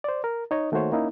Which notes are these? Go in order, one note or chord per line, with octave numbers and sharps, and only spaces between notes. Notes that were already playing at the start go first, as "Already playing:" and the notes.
C5 D5
A#4
D#4 C#5 D#5
D#3 A3 A#3 F#4 C5 C#5
A#3 C#4 D#4 E4